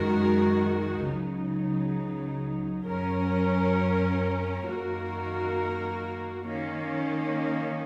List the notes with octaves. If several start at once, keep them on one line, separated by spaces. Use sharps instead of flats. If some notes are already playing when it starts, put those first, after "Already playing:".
Already playing: F#2 D#3 G#3 F#4 A#4
C#2 C#3 F#3 D#4
F#2 F#3 C#4 A#4
F#2 D#3 A#3 F#4 A#4
D#3 A#3 C#4